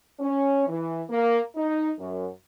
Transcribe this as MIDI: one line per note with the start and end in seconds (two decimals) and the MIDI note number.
0.20 0.64 61
0.67 1.01 52
1.09 1.39 58
1.56 1.91 63
1.99 2.27 42